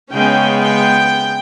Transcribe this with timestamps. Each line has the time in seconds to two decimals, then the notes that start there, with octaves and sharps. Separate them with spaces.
0.12 C#3 G#3 B3 C#4 G5
0.61 G5